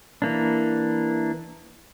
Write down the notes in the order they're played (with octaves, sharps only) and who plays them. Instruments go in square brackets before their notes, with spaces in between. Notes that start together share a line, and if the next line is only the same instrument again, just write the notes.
[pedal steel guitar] E3 A#3 D4